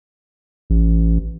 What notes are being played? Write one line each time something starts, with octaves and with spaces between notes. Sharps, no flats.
A1